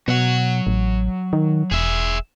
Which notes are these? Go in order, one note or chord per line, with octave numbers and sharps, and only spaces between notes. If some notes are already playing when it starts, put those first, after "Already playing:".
B2 F#3 F#5
A1
D#3
E1 G#4 E5